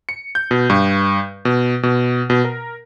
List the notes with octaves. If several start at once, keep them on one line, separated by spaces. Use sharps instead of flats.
C#7
G6
B2
G2
B2
B2
B2
A#4